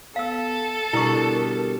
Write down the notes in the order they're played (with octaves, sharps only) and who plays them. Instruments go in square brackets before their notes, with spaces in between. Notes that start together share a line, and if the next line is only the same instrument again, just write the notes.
[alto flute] B3 [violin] A4 [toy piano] F5 E6
[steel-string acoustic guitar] B2 D3 G3 [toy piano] E4 C#6 [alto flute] A#4